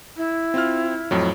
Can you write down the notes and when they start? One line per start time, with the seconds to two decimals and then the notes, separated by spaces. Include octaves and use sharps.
0.17 E4
0.54 C4 F4 F6
1.11 F2 A2 F#3